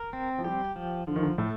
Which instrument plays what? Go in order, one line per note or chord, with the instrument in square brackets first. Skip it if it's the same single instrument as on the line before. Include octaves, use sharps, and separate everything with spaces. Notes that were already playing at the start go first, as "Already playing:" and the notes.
Already playing: [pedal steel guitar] A#4
C4
[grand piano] F3
[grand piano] G3 [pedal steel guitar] G4
[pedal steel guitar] F3
[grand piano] D3 [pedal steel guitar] F3
[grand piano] D#3
D3
[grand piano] A2 [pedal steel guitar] A3